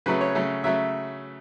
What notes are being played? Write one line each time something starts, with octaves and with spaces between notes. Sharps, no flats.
C#3 F#3 A3 B4
C#5
C#3 F#3 A3
C#3 F#3 A3 E5